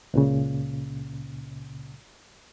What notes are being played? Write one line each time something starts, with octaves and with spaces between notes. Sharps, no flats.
C#2 A#2 C#3